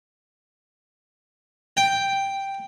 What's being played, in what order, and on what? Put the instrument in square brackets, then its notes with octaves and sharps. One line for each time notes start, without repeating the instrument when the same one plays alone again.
[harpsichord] G5